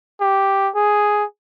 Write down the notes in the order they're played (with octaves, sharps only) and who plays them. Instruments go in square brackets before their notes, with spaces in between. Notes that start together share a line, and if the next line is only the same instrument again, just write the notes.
[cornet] G4
G#4